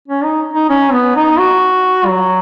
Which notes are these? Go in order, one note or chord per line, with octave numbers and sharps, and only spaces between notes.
C#4
D#4
D#4
C#4
B3
D#4
F#4
F#3